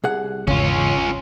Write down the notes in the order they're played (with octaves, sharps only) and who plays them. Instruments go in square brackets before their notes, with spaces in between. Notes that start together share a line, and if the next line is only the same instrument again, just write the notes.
[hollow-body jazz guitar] C2 G#4 F#5
[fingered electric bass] G#1 E2 G#2 [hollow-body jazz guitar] C#3 [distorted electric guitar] C#4 F4